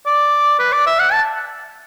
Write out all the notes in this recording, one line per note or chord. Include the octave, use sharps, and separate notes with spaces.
D5
B4
D5
E5
F#5
A5